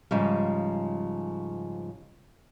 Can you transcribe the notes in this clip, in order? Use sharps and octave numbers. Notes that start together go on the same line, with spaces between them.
G#2 C#3 F3 G3